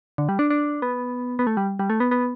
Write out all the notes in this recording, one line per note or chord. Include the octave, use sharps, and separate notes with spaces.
D3
G3
D4
D4
B3
B3
A3
G3
G3
A3
B3
B3